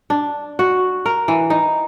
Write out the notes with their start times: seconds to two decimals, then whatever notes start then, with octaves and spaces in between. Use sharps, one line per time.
0.10 D4
0.59 F#4
1.06 A#4
1.28 E3
1.50 D#4